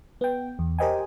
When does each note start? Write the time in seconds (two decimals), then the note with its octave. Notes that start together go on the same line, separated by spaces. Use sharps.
0.21 B3 G5
0.59 E2
0.79 G4 A#4 C5 D#5 G5 G#5